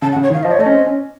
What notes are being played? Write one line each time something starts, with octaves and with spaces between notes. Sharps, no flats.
C#3 A5
F#5
C#3
C#5
D#3
F5
F3 D#5
C#5
A3 D#5
C#4
C4
C#4